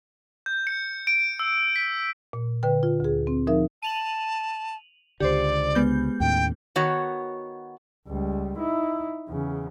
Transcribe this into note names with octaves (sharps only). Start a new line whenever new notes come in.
G6
C#7
D7
E6
B6
A#2
D3 B4 G5
F4
D2 G#4
C4
F3 D#4 A#4 E5
A5 D#7 F7 F#7
C#2 D3 G4 C5 D5
G#3 B3 G6
D#2 A2 C#4 G5
D#3 B3 F#4 C#5
C#2 G3
D#4 E4
E2 C#3